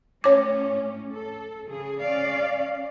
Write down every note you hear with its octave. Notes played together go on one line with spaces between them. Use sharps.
A2 C#4 C#5 D6
A4
C#3 G#4
C#4 D5 F5